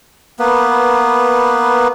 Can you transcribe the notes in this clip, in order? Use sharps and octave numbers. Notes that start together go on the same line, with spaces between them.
A#3 B3 B4